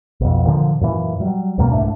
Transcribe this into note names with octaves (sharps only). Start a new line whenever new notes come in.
B1 F2
A#2 D3 E3 F3
F#2 A#2 E3
F#3 G3
C#2 F#2 B2 A#3
C2 G#2 A3 D4